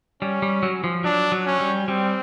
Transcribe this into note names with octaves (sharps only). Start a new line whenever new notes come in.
G3 C#4
G3
F#3
F3
F#3 D4
F#3
C#4
G3
G3 C4